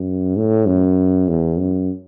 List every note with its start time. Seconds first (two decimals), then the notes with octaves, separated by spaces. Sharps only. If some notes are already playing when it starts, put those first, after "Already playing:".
Already playing: F#2
0.37 A2
0.67 F#2
1.28 E2
1.58 F#2